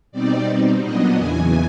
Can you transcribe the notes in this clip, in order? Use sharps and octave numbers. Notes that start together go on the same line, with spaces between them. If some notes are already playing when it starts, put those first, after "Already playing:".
B2 G3 C4 D#4 D5
B2 G3 C4 D#4
A#2 F#3 B3 D4 D#5
E2 C#3 E3 G#5